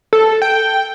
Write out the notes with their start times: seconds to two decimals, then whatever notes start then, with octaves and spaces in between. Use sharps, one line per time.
0.13 A4
0.42 G5